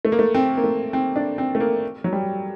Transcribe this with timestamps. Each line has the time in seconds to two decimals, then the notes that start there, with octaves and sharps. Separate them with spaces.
0.05 A3
0.12 A#3
0.19 A3
0.34 C4
0.57 A#3
0.64 A3
0.93 C4
1.16 D4
1.38 C4
1.55 A3
1.60 A#3
2.04 F#3
2.13 G3